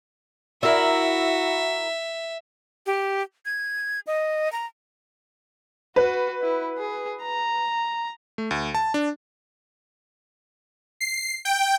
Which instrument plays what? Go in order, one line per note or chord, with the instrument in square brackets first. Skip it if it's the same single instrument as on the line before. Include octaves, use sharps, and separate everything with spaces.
[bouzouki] E4 A#4 [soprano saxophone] F#4 [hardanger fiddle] E5
[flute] G4
G#6
D#5
A#5
[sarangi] F#4 [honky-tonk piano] B4
[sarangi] E4
G#4
A#5
[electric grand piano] A3
D2
A5
D4
[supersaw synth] C7
G5